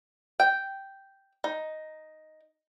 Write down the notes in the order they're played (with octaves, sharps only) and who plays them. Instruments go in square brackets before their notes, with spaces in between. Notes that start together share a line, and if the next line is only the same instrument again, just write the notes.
[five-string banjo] G5
D#4